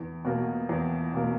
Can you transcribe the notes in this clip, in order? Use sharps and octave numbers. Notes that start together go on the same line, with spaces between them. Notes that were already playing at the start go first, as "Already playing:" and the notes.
Already playing: E2
B2 A#3
E2
B2 A#3